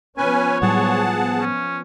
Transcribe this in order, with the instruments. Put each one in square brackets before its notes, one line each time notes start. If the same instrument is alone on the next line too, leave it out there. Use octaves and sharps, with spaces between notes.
[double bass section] F3 B3 [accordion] C#4 B4 G#5 [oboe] C#5
[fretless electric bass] A2 F#3 G3 [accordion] G#4 F#5 A5
[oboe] C#4